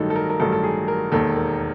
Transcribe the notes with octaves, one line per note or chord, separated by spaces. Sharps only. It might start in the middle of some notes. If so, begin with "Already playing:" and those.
Already playing: A1 G2 D#3 F#3 D#4 A4
A4
A#4
A#4
A1 G2 D#3 F#3 A4
A4
G#4
A#4
E1 D#2 D#3 A4
A#4